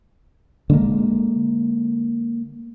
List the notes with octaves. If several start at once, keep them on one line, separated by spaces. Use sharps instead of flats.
D3 G#3 A#3